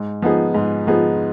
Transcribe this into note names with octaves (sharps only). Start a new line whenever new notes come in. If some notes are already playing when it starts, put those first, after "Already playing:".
Already playing: G#2
F3 B3 D#4 G#4
G#2
F3 B3 D#4 G#4